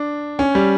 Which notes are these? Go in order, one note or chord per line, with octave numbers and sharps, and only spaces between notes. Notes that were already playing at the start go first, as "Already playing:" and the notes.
Already playing: D4
C#4
G3